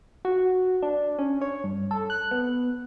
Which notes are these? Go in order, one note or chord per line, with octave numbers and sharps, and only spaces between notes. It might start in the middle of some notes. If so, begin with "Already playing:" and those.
F#4
D4
C#4
C#5
G2
A4
F#6
B3